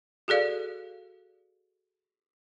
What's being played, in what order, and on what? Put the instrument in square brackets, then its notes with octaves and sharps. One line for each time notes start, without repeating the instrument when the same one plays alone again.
[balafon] F#4 G#4 A4 D5 F5